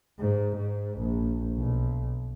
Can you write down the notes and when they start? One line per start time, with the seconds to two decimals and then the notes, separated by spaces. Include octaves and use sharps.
0.19 G#2
0.56 G#2
0.98 A#1
1.57 B1